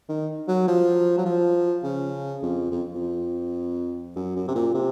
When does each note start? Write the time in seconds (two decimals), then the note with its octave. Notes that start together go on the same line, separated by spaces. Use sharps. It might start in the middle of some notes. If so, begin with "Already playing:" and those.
0.09 D#3
0.48 F#3
0.68 F3
1.18 F#3
1.26 F3
1.83 C#3
2.42 F2
2.71 F2
2.94 F2
4.16 F#2
4.36 F#2
4.48 C3
4.55 A#2
4.74 C3